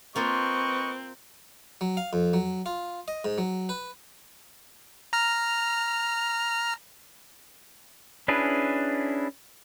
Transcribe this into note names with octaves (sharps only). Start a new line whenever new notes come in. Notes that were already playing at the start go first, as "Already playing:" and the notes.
A#3 C4 F4 B4 D#5 C#6
F#3
F5
F2
F#3
F4
D#5
G#2
F#3
B4
A#5 F6
C#4 D4 E4 G#4 B4